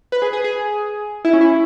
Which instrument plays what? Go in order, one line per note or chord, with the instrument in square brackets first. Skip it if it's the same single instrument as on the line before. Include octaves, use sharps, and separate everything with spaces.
[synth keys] B4
G#4
G#4
G#4
E4
C#4
E4